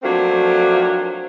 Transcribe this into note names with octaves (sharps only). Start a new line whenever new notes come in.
F3 F#3 A3 A#3 C4 D4